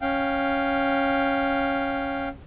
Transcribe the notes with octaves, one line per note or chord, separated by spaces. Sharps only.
C#4 F5 G5